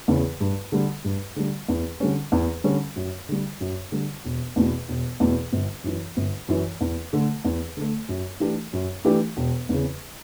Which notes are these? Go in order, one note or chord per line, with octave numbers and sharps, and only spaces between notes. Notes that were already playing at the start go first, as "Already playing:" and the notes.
E2 C#3
G2
D3 G3
G2
D3 G3
E2
D3 G3 C#4
E2
D3 G3 C#4
F#2
D3 G3
F#2
D3 G3
E1
E2 B2
E1
E2 B2
G1
F#2 E3
G1
F#2 E3
E2
D3 A3
E2
D3 A3
F#2
E3 A3 D4 G4
F#2
E3 A3 D4 G4
E1
E2 C#3